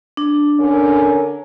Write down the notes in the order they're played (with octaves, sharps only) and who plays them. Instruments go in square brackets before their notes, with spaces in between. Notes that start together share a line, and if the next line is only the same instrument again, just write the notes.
[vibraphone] D4
[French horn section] D3 C#4 A#4